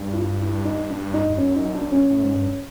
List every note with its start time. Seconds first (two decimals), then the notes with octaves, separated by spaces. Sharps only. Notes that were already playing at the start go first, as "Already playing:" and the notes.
Already playing: G2
0.13 E4
0.17 F4
0.41 E4
0.65 D#4
0.90 D4
1.14 D#4
1.30 G2
1.38 F#2 C#4
1.56 D#4
1.75 D4
1.92 C#4
2.11 A2
2.22 G#2
2.35 G2